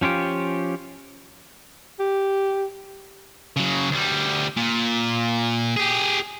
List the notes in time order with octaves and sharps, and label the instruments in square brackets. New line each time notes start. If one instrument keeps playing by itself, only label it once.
[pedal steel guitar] F3 C#4 F4 G4
[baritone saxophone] G4
[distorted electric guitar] C#3 F#3
D2 G3
A#2
G4 G#4